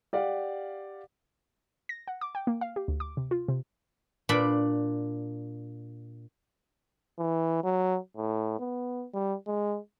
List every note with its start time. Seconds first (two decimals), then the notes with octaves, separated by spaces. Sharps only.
0.13 G4 D5 F5 F#5
1.89 A#6
2.08 F#5
2.21 D6
2.35 G5
2.47 A#3
2.61 F5
2.76 G4
2.88 D2
3.00 D6
3.17 C3
3.31 F4
3.48 C3
4.29 A#2 D4 D5 B5
7.19 E3
7.64 F#3
8.17 A2
8.60 B3
9.14 G3
9.47 G#3